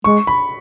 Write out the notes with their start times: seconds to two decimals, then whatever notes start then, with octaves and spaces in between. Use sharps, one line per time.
0.04 G#3 C#6
0.27 B5